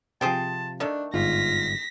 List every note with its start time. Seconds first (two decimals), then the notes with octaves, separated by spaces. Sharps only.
0.21 C3 F3 G#4 C5 G5 A5
0.80 D#3 A3 D4
1.14 G1 G#2 F4 A#6 B6